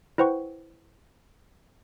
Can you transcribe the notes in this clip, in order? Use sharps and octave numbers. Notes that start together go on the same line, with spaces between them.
E4 B4 C5 F#5 G5 C#6